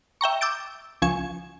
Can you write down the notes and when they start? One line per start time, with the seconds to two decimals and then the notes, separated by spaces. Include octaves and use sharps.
0.21 E5 G5 A#5 C#6
0.41 D6 E6 G6 A6 D7
1.02 C#2 F3 G#5 C#6 G#6 E7